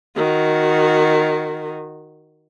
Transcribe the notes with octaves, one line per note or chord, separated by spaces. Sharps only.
D#3 F#4